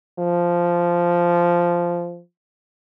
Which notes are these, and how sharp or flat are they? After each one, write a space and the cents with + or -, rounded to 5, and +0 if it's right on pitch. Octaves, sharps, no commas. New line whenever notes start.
F3 -10